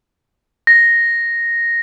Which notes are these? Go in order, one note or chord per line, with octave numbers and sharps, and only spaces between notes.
A#6